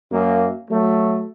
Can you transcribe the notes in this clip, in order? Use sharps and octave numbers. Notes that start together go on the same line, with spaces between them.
F#2 A#3
F#3 A3